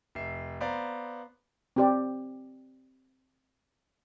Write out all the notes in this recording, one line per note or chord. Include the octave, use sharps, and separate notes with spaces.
F1 E5 C7
B3 C5 D5 F5 A#5
C4 G4 D5